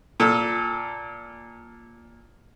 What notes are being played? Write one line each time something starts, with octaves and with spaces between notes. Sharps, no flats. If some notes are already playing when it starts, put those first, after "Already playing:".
A#2 A4